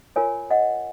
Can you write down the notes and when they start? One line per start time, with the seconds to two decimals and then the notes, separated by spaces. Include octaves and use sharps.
0.16 F4 A#4 C#5 F5 G#5
0.50 D#5 F#5